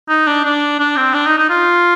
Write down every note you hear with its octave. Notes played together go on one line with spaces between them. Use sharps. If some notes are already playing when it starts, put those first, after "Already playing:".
D#4
D4
D4
D4
C4
D4
D#4
D#4
F4